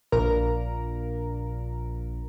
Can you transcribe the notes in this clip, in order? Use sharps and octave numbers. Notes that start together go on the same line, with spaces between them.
A#1 A#2 A#4